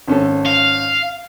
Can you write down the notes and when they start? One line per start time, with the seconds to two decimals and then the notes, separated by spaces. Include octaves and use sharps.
0.08 G#1 C#4 A4
0.45 F5